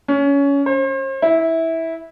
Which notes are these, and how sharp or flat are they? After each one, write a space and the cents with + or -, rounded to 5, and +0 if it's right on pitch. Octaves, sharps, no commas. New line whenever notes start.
C#4 +20
C5 +40
E4 -15